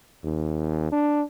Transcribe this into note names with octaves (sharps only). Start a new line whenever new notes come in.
D#2
D4